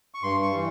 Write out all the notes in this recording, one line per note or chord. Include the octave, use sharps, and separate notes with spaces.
C#6
G2 C6
C#6
E3 G3